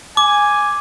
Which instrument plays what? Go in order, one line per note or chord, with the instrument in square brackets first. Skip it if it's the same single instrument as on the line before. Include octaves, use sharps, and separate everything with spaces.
[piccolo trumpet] G#5 [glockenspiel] D6